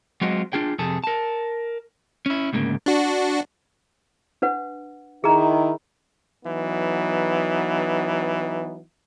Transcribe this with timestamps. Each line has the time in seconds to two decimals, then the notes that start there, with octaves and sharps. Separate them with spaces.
0.21 F#3 G#3 C4 F4 F#4 D#5
0.53 D4 F4 G#4 G5
0.79 F2 C3 G#4 A4
1.04 A#4 A5
2.26 C#4 E4
2.53 D2 G#2 C#3 A#3
2.86 D4 F#4
4.42 D4 B4 F#5
5.24 D#3 E4 G#4 A#5
6.44 E3 F#3 B3 D#4